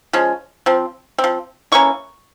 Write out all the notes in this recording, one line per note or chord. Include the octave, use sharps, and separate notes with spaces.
F3 G#3 C#4
F3 C4
C4
F3
E3 A#3 C#4 C#6